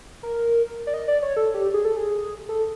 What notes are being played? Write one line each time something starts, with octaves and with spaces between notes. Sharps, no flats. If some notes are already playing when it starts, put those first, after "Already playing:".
A#4
D5
D#5
D5
C#5
A4
G4
G#4
A4
G#4
A4